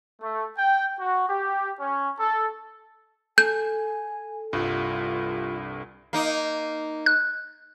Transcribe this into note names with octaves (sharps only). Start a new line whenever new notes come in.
A3
G5
F#4
G4
C#4
A4
A4 G#5 G6
C2 G2 F4
A#3 D#4
F#6